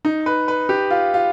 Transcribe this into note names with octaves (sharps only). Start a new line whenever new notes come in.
D#4
B4
B4
G4
F4
F4